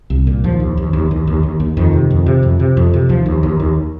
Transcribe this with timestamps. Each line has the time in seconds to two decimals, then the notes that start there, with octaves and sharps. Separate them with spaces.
0.10 C2
0.27 A#2
0.44 D#2 F3
0.60 D#2
0.77 D#2
0.93 D#2
1.11 D#2
1.27 D#2
1.43 D#2
1.60 D#2
1.77 F2 D#3
1.93 C3
2.11 F2
2.26 C3
2.43 F2
2.60 C3
2.77 F2
2.94 C3
3.09 D#2 F3
3.26 D#2
3.43 D#2
3.60 D#2